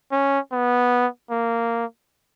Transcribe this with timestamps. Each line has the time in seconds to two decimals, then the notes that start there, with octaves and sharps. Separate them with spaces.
0.12 C#4
0.52 B3
1.30 A#3